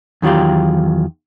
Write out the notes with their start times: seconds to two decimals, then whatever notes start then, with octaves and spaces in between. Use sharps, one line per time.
0.22 E2 D#3 F#3 F4 G4